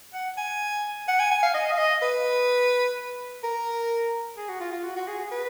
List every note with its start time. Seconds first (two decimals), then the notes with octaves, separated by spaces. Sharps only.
0.14 F#5
0.37 G#5
1.08 F#5
1.20 G#5
1.31 G#5
1.42 F5
1.54 D#5
1.72 F5
1.78 D#5
2.02 B4
3.43 A#4
4.37 G#4
4.48 F#4
4.60 F4
4.72 F4
4.83 F#4
4.96 F#4
5.07 G#4
5.19 G#4
5.31 B4